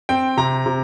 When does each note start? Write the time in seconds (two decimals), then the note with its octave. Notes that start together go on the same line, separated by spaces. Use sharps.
0.09 C4 G5
0.37 C3 A#5
0.66 C3